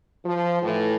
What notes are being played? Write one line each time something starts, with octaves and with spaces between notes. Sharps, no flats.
F3
A2 E3